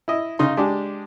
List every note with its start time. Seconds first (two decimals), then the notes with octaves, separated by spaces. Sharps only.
0.08 E4 D#5
0.39 C#3 D#4 C6
0.57 G#3 D4 G4